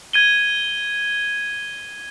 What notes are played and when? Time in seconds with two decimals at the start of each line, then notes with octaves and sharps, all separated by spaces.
0.13 G#6 D#7 G7